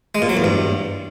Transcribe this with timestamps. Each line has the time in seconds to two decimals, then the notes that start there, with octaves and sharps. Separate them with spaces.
0.15 G#3
0.22 A#2
0.29 F#3
0.37 E2
0.44 G2